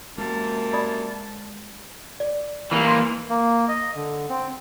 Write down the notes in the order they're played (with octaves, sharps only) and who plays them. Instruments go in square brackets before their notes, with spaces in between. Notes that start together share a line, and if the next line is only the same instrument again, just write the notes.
[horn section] F#2 C3 A#3 [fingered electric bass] G#3 [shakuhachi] A5
[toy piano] D5 B5 D#6
[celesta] D5
[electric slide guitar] E3 A#3
[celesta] C6
[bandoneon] A#3
D#5
D3
C4